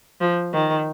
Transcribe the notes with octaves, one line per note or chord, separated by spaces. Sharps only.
F3
D#3